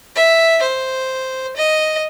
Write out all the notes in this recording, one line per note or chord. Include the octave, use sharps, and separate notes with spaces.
E5
C5
D#5